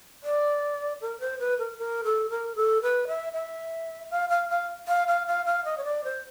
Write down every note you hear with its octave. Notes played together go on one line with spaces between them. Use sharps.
D5
A#4
C5
B4
A#4
A#4
A4
A#4
A4
B4
E5
E5
F5
F5
F5
F5
F5
F5
F5
D#5
C#5
D5
C5